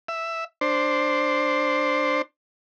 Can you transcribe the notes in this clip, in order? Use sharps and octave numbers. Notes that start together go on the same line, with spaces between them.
E5
D4 C5